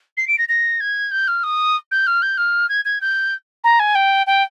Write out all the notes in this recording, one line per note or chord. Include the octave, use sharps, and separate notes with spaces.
C7
D7
A#6
A#6
G#6
G6
F6
D#6
G6
F6
G6
F6
G#6
G#6
G6
A#5
G#5
G5
G5